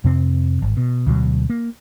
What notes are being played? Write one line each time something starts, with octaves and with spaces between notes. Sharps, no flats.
F2 C3 C4
G#1
B2
D2 B2 D3 F#3
A#3